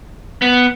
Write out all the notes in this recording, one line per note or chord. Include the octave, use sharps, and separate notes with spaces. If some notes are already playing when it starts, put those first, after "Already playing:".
B3